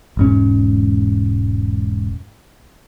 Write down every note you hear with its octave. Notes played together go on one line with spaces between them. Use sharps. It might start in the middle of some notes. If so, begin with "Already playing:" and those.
E1 G#2 C#4